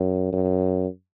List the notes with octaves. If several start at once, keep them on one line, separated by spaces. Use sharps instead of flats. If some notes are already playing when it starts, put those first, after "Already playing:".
Already playing: F#2
F#2